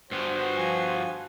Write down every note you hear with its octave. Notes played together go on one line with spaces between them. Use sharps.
G2 B3 F#4 C5
F3 G#5